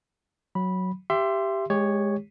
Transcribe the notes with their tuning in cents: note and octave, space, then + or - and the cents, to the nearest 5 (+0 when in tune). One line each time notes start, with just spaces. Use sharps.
F#3 +0 B5 -10
G4 +0 E5 +25 C6 +0
G#3 +0 G4 +30 C#5 +0